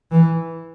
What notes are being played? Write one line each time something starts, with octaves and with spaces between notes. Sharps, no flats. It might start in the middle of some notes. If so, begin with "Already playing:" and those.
E3